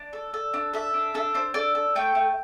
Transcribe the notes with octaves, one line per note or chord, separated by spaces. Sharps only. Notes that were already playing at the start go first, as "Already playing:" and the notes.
Already playing: D4 D5
A4
A4
D4
A4 E5
D4
D4 A4
D4 C5
A4 D5
A4
A3 G5
A3